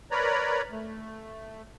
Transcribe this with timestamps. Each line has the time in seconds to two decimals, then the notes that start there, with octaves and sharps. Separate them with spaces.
0.11 A#4 B4 C#5 D5 A#5 B5
0.72 A3